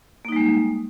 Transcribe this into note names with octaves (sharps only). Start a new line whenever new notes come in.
G3 G#3 A#3 D#4